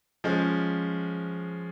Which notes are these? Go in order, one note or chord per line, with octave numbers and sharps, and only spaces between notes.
F3 G#3 C#4